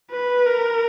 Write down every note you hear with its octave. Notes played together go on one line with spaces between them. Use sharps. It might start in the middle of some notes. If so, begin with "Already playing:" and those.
B4
A#4